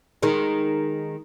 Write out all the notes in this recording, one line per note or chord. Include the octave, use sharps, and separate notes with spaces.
D#3 G#3